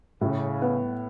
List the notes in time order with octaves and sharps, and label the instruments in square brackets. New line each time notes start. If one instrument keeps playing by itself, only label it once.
[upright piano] A2 [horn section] C#3
[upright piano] B3